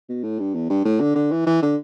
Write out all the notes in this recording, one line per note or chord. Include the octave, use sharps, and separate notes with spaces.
B2
A2
G2
E2
G2
A2
D3
D3
E3
E3
D3